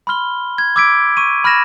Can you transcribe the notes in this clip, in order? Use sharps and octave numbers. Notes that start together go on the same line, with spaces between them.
B5 C6 F6 G7
G#6
D6 E6 G#6 B6 D7
C#6 D#7
B5 F6 G#6 A#6 E7